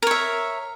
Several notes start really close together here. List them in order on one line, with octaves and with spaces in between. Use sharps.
A#4 C#5 E5